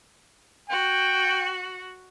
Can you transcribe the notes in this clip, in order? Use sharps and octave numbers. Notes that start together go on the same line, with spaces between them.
F#4 G5